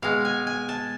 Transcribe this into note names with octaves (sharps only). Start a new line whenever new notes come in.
B2 G#3 F5
G#5
G#5
A5